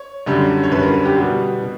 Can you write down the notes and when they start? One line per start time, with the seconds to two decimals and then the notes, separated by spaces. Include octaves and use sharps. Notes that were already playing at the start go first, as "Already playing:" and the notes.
Already playing: C#5
0.26 F#2 D3 G3
0.63 C#5
0.71 F#2 D3 G3 B4
0.83 A#4
0.94 B4
1.05 G4
1.17 B2 G3 B3 F#4
1.62 B2